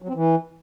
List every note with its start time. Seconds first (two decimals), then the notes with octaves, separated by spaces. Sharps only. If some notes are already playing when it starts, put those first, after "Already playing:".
0.02 F#3
0.09 C4
0.15 E3